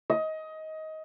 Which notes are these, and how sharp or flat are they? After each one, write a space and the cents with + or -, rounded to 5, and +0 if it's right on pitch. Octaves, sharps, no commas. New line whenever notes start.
D#5 +20